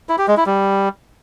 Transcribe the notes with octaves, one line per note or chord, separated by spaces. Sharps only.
E4
G4
G#3
E4
G3